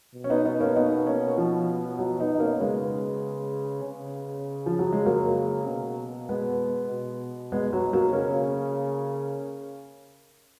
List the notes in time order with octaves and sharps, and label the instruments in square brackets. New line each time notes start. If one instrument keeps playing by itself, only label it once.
[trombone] B2
[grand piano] C#4
B3 D#4
B3 D#4
A#3 C#4
B3 D#4
A#3 C#4
F3
F#3
B3 D#4
D#4
A#3 C#4
[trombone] C#3 [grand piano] G#3 B3
[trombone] C#3
[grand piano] F3
F#3
G#3
F#3 A#3
[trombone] B2
[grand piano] G#3 B3
[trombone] B2
[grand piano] G#3 B3
F#3
F#3 A#3
[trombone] C#3 [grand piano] A#3 C#4